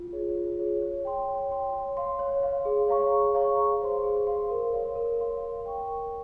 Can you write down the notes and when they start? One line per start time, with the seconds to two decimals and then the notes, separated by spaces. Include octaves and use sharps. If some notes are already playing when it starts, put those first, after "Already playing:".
Already playing: F4
0.12 G#4 C#5
0.36 F4
0.59 G#4 C#5
0.82 C#5
1.05 G5 C6
1.28 C#5
1.50 G5 C6
1.74 C#5
1.97 F5 C6
2.19 C#5
2.43 F5 C6
2.65 G#4
2.88 C#5 F5 A#5 C#6
3.12 G#4
3.35 C#5 F5 A#5 C#6
3.58 G#4
3.81 C5 F5 C6
4.04 G#4
4.27 C5 F5 C6
4.50 A#4
4.73 C#5 F5 C6
4.95 A#4
5.19 C#5 F5 C6
5.42 A#4
5.64 C#5 G5 C#6
5.87 A#4